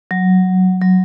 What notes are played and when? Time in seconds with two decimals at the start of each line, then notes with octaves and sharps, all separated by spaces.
0.11 F#3
0.81 F#3